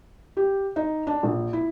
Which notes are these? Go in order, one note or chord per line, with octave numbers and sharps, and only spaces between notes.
G4
D#4
D4
A#1
E4